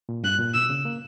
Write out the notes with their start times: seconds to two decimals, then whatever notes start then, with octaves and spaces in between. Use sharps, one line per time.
0.09 A#2
0.23 G2 F#6
0.39 A#2
0.54 B2 E6
0.69 C#3
0.85 A#3